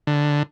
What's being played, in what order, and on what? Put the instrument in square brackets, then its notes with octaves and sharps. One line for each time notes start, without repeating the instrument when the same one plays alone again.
[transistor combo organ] D3